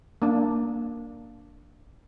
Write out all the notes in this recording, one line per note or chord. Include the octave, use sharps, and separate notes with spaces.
A#3 D4